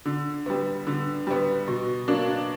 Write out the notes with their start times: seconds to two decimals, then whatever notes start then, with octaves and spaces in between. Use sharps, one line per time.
0.05 D3
0.46 G3 B3
0.87 D3
1.27 G3 B3
1.68 B2
2.08 F#3 A#3 D4